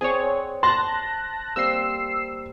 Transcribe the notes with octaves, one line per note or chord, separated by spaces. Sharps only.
C4 G#4 C#5 D5 F#5
A5 C6 F#6 A#6
G3 A#3 C4 E6 C7